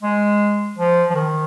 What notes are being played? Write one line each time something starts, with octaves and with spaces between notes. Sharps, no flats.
G#3
F3
F3
D#3